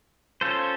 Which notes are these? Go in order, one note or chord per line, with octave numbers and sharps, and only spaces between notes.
C#4 F4 A4 C5